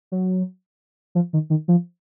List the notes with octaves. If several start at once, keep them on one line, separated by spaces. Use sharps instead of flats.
F#3
F3
D#3
D#3
F3